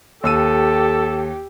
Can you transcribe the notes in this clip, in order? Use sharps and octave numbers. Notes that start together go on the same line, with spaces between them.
D#2 G4 A4 E6 D#7